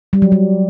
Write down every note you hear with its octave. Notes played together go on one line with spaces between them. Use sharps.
G3
F#3
G3